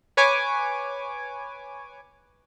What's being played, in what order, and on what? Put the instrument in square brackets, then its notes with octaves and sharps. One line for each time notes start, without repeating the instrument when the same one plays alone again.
[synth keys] B4 C#5 G#5 D6